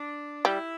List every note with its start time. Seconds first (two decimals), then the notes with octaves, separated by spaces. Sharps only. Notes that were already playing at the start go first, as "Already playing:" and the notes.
Already playing: D4
0.45 G3 E4